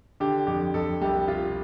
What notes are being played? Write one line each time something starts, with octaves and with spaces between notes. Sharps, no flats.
D3 G4
F2 G4
F2 A4
C2 G4
C3 F4